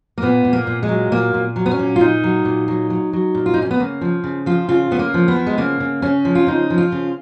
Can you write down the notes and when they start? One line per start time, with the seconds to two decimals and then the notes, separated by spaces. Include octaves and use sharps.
0.18 A#3
0.22 A#2 B3
0.45 A#2
0.53 A#3
0.67 A#2
0.83 G#3
0.89 F#3
1.11 A#2 A#3
1.34 A#2
1.56 F#3
1.66 B3
1.71 C#4
1.79 A#2
1.96 F4
2.01 A#2 D#4
2.24 F#3
2.45 A#2
2.68 F#3
2.90 F#3
3.13 F#3
3.35 A#2
3.46 F4
3.54 D#4
3.57 A#2
3.62 C#4
3.71 B3
3.80 C#3 A#3
4.01 F3
4.24 C#3
4.46 F3 F4
4.69 C#3 F4
4.91 C#3 B3
4.99 A#3
5.14 F3
5.28 B3
5.36 F3
5.47 G#3
5.58 C#3 A#3
5.80 C#3
6.02 C#3 C#4
6.25 F3
6.35 F4
6.47 C#3 D#4
6.70 F3
6.78 F4
6.92 C#3